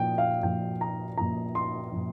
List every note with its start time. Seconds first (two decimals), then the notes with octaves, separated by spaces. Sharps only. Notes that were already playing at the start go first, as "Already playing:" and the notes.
Already playing: A#2 F3 G5
0.18 F5
0.43 A#2 F3 G5
0.81 A#5
1.18 A#2 F3 A#5
1.55 C6
1.92 A#2 F3